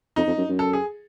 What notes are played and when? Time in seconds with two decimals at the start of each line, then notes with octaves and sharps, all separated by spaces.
0.16 F2 D#4
0.27 F2
0.37 F#2
0.49 F#2
0.59 A4
0.73 G#4